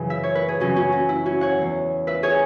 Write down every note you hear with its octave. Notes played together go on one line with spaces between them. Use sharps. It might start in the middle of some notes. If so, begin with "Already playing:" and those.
Already playing: F#2 C#3 E3 E4 G#4 B4
E5
C#5
B4
G#4
F#2 C#3 E3 C#4 F#4
C#4 F#4
C#4 F#4
E4
C#4 F#4
C#5 F#5
E2 E3
B4 E5
G#4 C#5